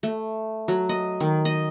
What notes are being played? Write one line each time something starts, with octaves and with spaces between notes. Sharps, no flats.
A3
F#3
D#5
D#3
D#5